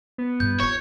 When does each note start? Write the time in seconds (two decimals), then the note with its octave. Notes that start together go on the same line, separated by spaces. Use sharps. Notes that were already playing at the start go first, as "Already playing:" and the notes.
0.18 B3
0.40 G2 G6
0.60 D#4 F4 C#5